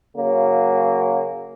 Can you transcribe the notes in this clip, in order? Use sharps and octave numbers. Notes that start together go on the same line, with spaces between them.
C#3 F#3 A#3